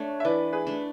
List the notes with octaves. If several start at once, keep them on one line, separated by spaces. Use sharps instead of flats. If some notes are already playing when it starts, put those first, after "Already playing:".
Already playing: A3 D4 C#5
E5
E3 B4 D5
G#4 B4
A3 D4